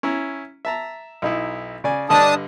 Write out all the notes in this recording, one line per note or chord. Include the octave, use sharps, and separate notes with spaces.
C#4 E4 A#5
E5 A5 A#5
B1 D#4 E4
C#3 D5 G#5
G2 D3 D4 D#5 A5 D#6